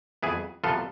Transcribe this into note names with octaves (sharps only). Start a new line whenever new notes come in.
F2 E3 B3 E4 G#4
C3 F3 B3 F4 A4